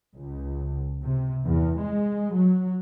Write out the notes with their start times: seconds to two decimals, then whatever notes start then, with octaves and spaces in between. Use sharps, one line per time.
0.15 C#2
1.04 C3
1.45 E2
1.81 G#3
2.33 F#3